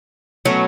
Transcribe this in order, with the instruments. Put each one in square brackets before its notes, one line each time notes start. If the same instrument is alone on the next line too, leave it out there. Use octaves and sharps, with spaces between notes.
[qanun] B2 A3 C#4 [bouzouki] F#3